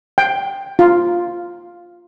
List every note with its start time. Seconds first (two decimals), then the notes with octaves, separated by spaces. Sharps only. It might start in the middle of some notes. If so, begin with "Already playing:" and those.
0.18 G5
0.79 F4